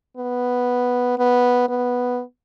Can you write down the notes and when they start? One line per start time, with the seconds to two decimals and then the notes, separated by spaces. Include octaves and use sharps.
0.17 B3
1.18 B3
1.69 B3